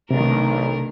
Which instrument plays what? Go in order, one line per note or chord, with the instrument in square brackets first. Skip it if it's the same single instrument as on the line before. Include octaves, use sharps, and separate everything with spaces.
[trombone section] B1 [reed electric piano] C3 [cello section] D#3 A3 D4 [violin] A#4